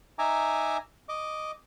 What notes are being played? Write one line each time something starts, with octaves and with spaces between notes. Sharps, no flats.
D#4 E5 G#5 A#5 D6
D#5 D6